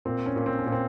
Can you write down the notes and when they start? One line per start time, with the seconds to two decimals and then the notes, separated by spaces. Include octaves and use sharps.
0.05 A#2 C4
0.26 C#4
0.36 A#2
0.46 C4
0.59 C#4
0.66 A#2
0.72 C4